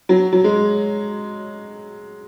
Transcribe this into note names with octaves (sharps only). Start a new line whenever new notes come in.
F#3
F#3
G#3